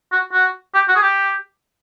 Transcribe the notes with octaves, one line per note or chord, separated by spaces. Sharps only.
F#4
F#4
G4
F#4
G#4
G4